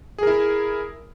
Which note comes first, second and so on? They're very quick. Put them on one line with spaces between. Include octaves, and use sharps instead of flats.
G#4 A#4 E4